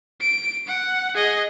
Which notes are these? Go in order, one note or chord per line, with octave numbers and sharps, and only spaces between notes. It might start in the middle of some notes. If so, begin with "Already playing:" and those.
D7
F#5
G#4 D#5